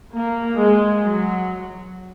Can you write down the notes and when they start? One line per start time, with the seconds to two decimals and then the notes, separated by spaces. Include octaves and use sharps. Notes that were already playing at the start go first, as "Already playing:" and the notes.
0.15 A#3
0.59 G#3
1.02 F#3